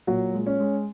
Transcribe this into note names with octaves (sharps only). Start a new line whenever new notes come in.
A#2 F#3 F#4
G#3
C#4
G#3